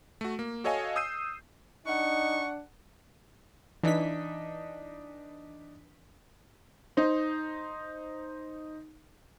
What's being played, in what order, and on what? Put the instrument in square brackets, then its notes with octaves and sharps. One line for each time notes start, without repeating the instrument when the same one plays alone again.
[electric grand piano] A3 F#4
A#3
F#4 A4 C#5 D#5 F5 G#5
D#6 E6 G6 C7 D#7
[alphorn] D4 [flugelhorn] D#4 [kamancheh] F#5 [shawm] C#6
[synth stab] E3 B6 [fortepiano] D4 D#4
[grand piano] D#4 C5